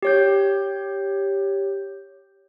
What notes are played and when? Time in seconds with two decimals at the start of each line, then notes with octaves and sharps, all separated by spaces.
0.03 G4 C#5 G6